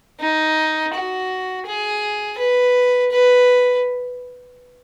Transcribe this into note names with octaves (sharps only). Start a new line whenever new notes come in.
D#4
F#4
G#4
B4
B4